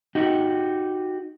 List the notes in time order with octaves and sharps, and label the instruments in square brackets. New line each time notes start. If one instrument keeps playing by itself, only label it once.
[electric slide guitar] D#4 F#4 G4